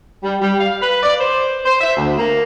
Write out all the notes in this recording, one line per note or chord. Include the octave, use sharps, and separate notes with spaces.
G3
G3
F5
B4
D5
C5
C5
E5
D2
A#3